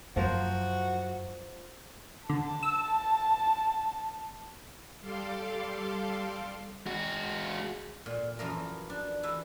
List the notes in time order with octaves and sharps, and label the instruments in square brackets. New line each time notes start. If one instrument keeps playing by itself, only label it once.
[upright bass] F#2 [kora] F3 A#4 C5 [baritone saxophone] F#4
[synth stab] D3 [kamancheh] A5
[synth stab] E6
[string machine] G3 A4 F5 C6 D6
[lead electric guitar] G#3 F#4
[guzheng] A#2
F#2 E3 F3 A#4
D4
E3 E4 B4 E5